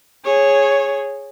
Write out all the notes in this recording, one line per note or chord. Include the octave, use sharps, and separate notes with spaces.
G#4 C#5